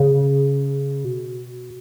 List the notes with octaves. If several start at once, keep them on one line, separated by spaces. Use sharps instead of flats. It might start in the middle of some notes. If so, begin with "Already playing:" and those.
Already playing: C#3
B2